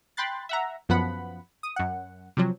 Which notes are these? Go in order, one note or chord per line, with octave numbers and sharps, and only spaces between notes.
G5 B5 C6 F#6 A6
E5 F#5 A#5
F#2 F3 B3 F#5 B5
D#6
F#2 F#5
C3 F3 F#3